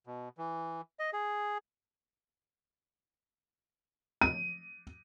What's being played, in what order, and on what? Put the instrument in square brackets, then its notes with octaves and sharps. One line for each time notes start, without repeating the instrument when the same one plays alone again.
[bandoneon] B2
E3
D#5
G#4
[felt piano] D#7